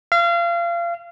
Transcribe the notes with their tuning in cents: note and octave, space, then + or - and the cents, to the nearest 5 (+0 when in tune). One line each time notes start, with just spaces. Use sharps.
F5 -30